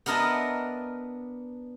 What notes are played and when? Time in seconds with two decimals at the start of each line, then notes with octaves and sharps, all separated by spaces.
0.06 B3 D4 A#4 D#5 E5 A5